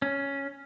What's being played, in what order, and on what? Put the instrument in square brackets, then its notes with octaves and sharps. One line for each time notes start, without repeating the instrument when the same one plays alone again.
[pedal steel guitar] C#4